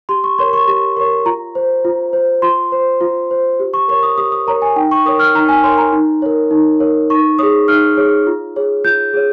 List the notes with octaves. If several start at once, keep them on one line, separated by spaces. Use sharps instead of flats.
G4 C6
C#6
A#4 C#5 C6
C#6
G4 C#6
A#4 C#5 C#6
F4 A#5
C5
F4
C5
F4 C6
C5
F4
C5
G4
C#6
A#4 C#5 C#6
D#6
G4 D#6
D#6
A#4 C#5 A#5
G#5
D#4 G5
C#6
A#4 C#5 D#6
F6
D#4 A#5
G#5
A#4 C#5 C6
A#5
D#4
A#4 C#5
D#4
A#4 C#5
D#4 C#6
G#4 C#5 D#6
D#4 F6
G#4 C#5
F4
G#4 C#5
F4 G6
G#4 C#5